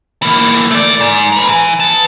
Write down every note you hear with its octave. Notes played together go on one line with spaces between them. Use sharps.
E3 A#3
A3 D5
G#2
A#4 B4
E3
B4 A5